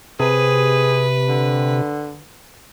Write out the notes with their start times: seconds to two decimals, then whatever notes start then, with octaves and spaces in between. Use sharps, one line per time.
0.20 C3 G#4 B4
1.29 D3